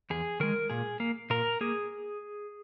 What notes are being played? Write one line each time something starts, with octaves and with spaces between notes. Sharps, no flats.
E2 G#4
D#3 G#3 A#4
A#2 G#4
A#3
A#2 A#4
A#3 G#4